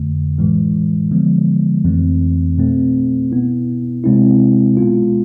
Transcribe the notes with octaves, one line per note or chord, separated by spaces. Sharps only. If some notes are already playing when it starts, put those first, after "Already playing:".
Already playing: F2 D3 A3
A2 E3 G#3
D3 F3 G#3 B3
F2 E3 A3 C4
B2 A3 C4
B2 B3 E4
C3 G#3 C4 E4
B2 G#3 B3 F4